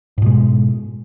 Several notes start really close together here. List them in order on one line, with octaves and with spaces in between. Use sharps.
G#2 B2 G#3